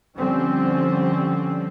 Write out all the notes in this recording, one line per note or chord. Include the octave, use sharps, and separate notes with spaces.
D3 F3 G3 C4 C#4